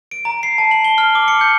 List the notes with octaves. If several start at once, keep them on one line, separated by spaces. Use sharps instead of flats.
D7
A#5
C7
A5
F#7
G7
F6
D6
C#7
G6